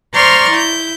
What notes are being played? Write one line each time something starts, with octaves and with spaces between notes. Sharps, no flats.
C5 D5 A#5 C6 C#6 F6
E4 G6